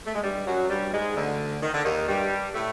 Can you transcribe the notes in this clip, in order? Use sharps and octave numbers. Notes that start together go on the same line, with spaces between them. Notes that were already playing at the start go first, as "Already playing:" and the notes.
A3
G#3
G2 G3
F#2 F#3
G2 G3
G#2 G#3
D2 D3
D#3
D3
D#2 D#3
G2 G3
A2 A3